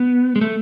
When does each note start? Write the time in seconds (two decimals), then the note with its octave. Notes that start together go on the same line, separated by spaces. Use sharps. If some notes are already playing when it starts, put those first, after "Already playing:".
Already playing: B3
0.36 G#3
0.41 A3